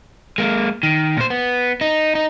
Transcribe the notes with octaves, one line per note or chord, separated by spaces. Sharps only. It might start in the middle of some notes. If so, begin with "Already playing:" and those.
G#3 A#3
D#3
A#2 C5
B3
D#4
D#4